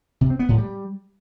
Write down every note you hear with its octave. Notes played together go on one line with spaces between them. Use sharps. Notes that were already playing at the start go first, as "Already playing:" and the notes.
C3
C4
B3
A2
G3